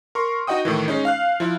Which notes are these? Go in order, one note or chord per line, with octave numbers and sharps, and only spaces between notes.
A#4 C6 C#6
D#4 F#4 D#5 F#5 G5 D#6
A2 D#3 E3
G#3 C#4 D#4
F5 F6 F#6
F3 E4